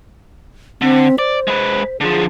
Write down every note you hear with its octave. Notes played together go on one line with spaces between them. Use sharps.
D3 C4
C5 D5
G#3 B4
D3 F3 G#4